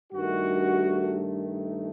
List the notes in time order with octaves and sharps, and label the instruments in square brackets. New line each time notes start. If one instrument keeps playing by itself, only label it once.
[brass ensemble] G2 D#3 A3 F#4